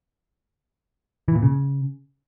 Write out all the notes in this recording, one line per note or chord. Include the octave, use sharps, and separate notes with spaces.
E3
A#2
C#3